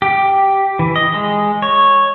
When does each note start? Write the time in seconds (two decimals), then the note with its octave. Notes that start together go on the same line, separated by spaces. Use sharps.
0.02 G4
0.79 E3
0.96 D#5
1.14 G#3
1.62 C#5